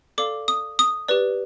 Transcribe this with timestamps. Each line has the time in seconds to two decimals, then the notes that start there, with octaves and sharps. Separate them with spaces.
0.18 A4 D5 F5 D6
0.48 D#6
0.79 D#6
1.08 G4 B4 D5